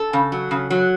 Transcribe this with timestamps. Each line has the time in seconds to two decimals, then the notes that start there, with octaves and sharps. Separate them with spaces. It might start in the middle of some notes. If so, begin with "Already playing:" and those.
Already playing: A4
0.13 C#3
0.32 F#3
0.51 C#3
0.70 F#3